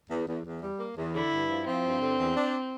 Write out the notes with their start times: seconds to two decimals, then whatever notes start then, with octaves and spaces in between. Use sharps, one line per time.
0.10 E2
0.28 E2
0.45 E2
0.62 G3
0.80 A#3
0.98 E2
1.15 D3 E4
1.32 G2
1.49 F3
1.67 F3 C4
1.85 G2
2.01 D3
2.19 E2
2.37 D4